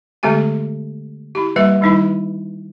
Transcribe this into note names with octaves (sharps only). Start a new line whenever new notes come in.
D3 G#3 A3 B3 G4 G#5
E4 G4
E3 G3 A#3 B4 E5 F#5
D#3 G3 D#4 E4